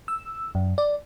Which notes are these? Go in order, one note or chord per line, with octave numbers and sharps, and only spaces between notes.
E6
F#2
D5